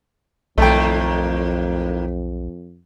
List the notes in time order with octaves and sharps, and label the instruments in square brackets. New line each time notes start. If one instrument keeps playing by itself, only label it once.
[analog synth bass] B1 [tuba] F2 [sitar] A2 D#3 A#3 [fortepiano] A3 G5